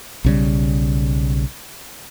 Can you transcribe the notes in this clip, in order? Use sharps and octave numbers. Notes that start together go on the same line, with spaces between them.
B1 C#3 G3